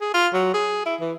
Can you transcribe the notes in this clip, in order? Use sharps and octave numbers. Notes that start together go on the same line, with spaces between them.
G#4
F4
F#3
G#4
E4
E3